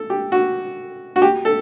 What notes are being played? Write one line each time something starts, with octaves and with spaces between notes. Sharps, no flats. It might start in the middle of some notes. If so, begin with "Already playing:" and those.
Already playing: A4
G4
F#4
F#4
G4
A4